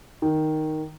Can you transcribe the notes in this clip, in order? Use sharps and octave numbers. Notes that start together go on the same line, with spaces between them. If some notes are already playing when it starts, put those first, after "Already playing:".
D#3